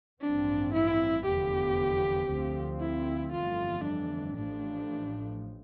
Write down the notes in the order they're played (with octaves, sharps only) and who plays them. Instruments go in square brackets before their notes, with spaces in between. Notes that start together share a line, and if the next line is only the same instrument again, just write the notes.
[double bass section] A1 G2 F3 C4 [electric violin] D4
[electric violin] E4
[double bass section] F1 E2 D3 F3 B3 [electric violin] G4
[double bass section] D2 D3 F3 C4
[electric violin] E4
[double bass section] G1 F2 E3 A3 [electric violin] F4
[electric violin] D4
[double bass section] A1 A2 F3 [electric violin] D4